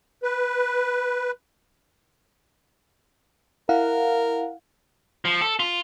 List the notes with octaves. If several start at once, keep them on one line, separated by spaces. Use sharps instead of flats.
B4
E4 A#4 F5 F#5
F3
A4
F4